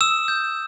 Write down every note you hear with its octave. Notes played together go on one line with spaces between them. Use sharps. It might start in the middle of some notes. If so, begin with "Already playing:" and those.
D#6 E6 E7
G6